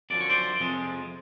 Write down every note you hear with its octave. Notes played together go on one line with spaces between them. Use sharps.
F#2 D3 F3 D5
C#5
C5 D5
F2 C3 F3 G#3